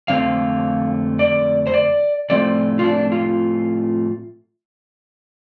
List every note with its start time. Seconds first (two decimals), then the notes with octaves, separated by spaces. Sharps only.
0.08 F2 D3 A3 C4 F5
1.19 D5
1.67 C5
1.74 D5
2.30 A2 F3 A3 C4 D5
2.79 F4
2.84 D4
3.12 F4